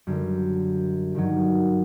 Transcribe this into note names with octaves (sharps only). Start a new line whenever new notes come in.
F#2 D3 G3
G2 D#3 F#3